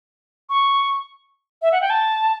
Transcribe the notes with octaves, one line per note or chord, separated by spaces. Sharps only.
C#6
E5
F#5
G5
A5